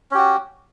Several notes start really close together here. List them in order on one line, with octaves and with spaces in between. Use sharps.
C#4 G4 F#4